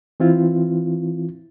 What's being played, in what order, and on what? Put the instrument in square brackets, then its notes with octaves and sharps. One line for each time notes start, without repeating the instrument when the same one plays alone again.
[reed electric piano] E3 C4 E4 F4